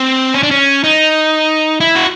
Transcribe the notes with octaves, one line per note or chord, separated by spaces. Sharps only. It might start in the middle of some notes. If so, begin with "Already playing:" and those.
Already playing: C4
C#4
D4
C#4
D#4
E4
F#4